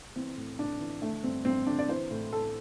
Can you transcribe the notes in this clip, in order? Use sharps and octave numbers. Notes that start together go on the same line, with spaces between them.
E3 C4
A2
A2 D4
E3
D3 A3
G2 C4
G2 C4
D3 D4
D5
E3 C5
A2
A2 A4